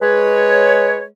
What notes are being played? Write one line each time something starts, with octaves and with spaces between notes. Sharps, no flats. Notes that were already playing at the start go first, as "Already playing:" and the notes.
G#3 B4 C#5